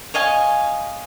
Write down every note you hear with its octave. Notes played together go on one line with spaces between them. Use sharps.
C#5 D#5 F5 G#5